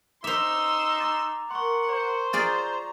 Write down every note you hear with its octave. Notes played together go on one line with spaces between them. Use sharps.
D#4 C5 E5 C6 D6 E6 F7
A#5 D6 A6
A#4 F#5 C6 C#6
C5
F4 G#4 D5 A#5